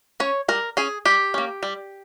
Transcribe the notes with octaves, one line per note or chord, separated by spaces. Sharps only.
C#4 C#5
G3 A#4
C#4 G#4
G3 G4
A#3 C#4
G3